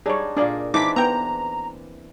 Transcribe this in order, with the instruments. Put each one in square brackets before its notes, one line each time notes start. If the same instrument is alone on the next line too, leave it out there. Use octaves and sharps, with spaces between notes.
[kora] G3 D4 D#4 [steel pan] G#4 C#5
[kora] A#2 A#3 G#4 [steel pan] D4 D5
[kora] E3 C4 D4 [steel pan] D#4 [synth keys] D6 B6
[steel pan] B3 G5 [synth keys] A#5